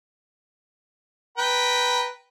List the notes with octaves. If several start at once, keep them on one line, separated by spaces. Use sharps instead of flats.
B4 G5 A#5